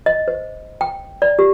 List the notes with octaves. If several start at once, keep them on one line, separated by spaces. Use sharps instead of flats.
D#5
C5
G5
D5
G4